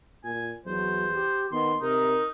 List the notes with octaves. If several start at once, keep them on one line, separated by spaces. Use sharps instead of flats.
A#2 G#5
E2 F#3 C5
G4
D#3 B3 C6
C3 D#4 A#4